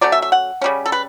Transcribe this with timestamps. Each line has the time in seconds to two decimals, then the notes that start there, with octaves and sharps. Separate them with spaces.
0.01 F#3 A3 C#4 D5
0.12 E5
0.22 E5
0.32 F#5
0.62 C#3 G3 C#4
0.86 A4
0.92 B4